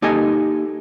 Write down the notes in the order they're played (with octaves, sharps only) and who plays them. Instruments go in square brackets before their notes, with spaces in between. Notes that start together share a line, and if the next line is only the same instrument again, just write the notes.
[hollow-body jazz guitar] A#3 D#4 G4 A4 D#5 G#5